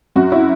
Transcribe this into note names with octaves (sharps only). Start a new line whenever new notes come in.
F#2 F#4
E4